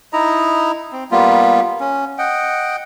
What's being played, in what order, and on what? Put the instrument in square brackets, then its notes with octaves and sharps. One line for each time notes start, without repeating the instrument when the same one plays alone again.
[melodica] D#4 E4 D#5 A#5
C4
G3 A#3 B3 F4
C#4
D#5 F#5 G5